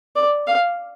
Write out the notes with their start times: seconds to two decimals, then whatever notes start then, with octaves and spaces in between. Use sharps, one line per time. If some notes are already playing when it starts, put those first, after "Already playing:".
0.16 D5
0.47 F5